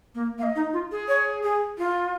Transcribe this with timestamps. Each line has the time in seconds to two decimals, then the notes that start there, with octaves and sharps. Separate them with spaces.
0.15 A#3
0.38 A#3 F5
0.43 D#5
0.56 D#4
0.73 F4
0.92 G#4
1.08 C#5
1.43 G#4
1.78 F4